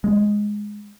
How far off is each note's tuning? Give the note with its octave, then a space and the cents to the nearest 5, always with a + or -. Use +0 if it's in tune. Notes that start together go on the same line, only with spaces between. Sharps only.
G#3 +0